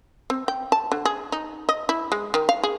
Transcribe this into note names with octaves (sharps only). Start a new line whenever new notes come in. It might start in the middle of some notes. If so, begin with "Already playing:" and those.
C4
G5
A5
D3
G#4
D#4
D#5
E4
G#3
D#3
F5
G#4